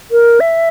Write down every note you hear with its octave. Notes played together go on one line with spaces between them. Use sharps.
A#4
E5